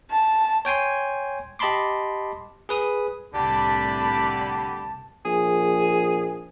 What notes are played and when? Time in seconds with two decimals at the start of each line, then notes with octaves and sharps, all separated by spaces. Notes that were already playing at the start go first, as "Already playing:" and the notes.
0.11 A5
0.65 C#5 G5 G#5 C6
1.59 G4 D#5 A5 B5 C6 D6
2.69 G#4 B4 D#6
3.33 C2 A2 D3 G4 D5 A5 B5
5.25 A#1 G#4